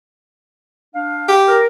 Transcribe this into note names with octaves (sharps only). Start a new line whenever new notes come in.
D4 F5
G4
A#4